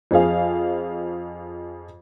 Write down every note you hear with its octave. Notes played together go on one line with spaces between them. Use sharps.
F2 C4 G#4 F5